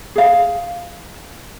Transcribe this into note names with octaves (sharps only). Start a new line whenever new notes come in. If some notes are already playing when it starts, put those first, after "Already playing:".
G#4 F5